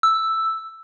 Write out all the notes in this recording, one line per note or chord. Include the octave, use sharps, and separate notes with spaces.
E6